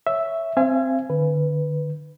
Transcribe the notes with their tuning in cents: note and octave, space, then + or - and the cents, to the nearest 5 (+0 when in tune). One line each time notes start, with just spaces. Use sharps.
C#5 +0 E5 +0
C4 +0 F5 -45 G#5 +0
D3 +35 B4 +0